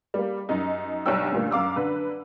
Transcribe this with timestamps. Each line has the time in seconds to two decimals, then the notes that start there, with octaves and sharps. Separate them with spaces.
0.14 G3 A#3
0.49 F#2 D#4
1.06 B1 G2 D4 C#5 G5 E6
1.32 D2 G2 A#2 A#3
1.51 F#2 F5 D6 E6
1.76 D3 B4